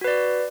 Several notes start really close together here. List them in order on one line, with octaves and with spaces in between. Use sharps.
F#4 B4 D5